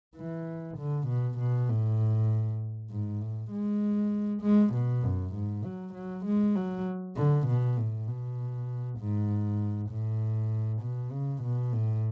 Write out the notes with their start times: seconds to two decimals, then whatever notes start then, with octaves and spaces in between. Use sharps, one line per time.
0.16 E3
0.78 D3
1.07 B2
1.38 B2
1.69 A2
2.90 G#2
3.21 A2
3.51 G#3
4.42 G#3
4.73 B2
5.03 F#2
5.34 G#2
5.64 F#3
5.94 F#3
6.25 G#3
6.55 F#3
7.16 D3
7.47 B2
7.77 A2
8.08 B2
8.99 G#2
9.90 A2
10.82 B2
11.12 C#3
11.42 B2
11.73 A2